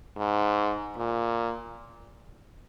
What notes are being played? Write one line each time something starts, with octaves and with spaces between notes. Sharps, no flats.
G#2
A#2